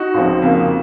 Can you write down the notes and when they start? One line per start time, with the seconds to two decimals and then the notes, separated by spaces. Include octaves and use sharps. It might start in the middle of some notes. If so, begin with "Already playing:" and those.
Already playing: D#4 F#4
0.14 C#2 C#3 F3 C4
0.42 F2 C#3 F3 A#3